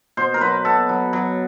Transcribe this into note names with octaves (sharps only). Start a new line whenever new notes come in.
B2 C5
A#4
F#3 B4
B2 A4
F#3
F#3